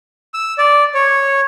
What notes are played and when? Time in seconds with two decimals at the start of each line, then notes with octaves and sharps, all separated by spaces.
0.34 E6
0.58 D5
0.94 C#5